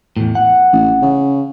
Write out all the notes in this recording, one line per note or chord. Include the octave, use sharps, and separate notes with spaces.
E2 A2
F#5
A1
C#3